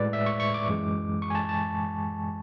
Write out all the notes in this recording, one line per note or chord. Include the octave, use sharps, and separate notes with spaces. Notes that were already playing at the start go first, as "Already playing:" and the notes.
Already playing: A2 G#3 B4 D5
E5
C#6
C#6
D6
F#2 E3 G#3
C#6
G#5
A5
A5